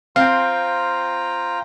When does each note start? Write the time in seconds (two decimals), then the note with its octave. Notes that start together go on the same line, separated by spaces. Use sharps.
0.16 C4 F4 F5 G5 A#5